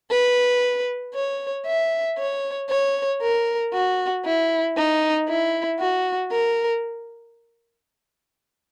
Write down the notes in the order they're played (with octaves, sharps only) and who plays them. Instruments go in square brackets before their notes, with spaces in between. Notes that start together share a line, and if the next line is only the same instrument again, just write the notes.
[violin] B4
C#5
E5
C#5
C#5
A#4
F#4
E4
D#4
E4
F#4
A#4